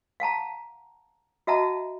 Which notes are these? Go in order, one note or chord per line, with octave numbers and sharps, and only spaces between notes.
F5 F#5 A5 A#5
F#4 D#5 E5 F#5 A5 A#5